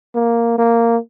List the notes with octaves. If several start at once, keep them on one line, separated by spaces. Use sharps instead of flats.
A#3
A#3